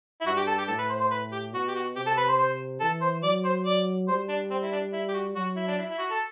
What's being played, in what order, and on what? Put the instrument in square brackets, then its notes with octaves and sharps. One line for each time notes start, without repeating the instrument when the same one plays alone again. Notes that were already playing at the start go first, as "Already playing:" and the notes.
[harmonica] E4
[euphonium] G2 [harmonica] F#4
[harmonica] G4
A4
G4
[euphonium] A2 [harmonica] A4
[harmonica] B4
C5
C5
B4
G4
[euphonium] B2 [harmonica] F#4
[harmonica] G4
F#4
[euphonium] C3 [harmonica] G4
[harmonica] A4
B4
C5
C5
[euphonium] E3 [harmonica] A4
[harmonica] C5
[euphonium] F#3 [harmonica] D5
[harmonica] C5
D5
[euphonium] G3 [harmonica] C5
[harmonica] D4
C4
E4
D4
E4
G4
F#4
[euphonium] F#3 [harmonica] F#4
[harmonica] E4
D4
E4
E4
F#4
A4